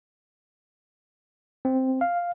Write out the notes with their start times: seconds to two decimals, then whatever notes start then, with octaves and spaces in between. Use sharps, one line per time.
1.65 C4
2.01 F5